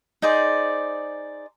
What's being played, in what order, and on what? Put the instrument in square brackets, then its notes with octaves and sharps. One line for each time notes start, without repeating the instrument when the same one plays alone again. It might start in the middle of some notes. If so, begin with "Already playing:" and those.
[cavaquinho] D#4 G#4 C5 D5